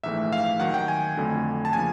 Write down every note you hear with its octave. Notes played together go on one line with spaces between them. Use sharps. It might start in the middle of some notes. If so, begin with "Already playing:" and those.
A#1 G#2 E3 A3 E5
F5
D#2 D#3 F#3 F#5
G5
G#5
F2 D3 F#3 A3
A5
C#3 F3 A#3 G#5